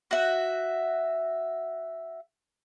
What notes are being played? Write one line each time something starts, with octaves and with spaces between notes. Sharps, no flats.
F#4 E5